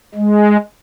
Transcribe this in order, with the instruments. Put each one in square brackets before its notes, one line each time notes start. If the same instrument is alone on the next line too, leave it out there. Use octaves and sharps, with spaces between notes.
[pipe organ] G#3